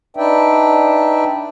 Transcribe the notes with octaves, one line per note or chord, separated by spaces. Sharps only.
D4 D#4 B4 D5 E5 G5